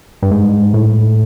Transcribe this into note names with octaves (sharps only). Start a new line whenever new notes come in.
G2
G#2
A2